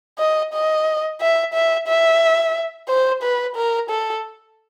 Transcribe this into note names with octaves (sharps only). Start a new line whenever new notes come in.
D#5
D#5
E5
E5
E5
C5
B4
A#4
A4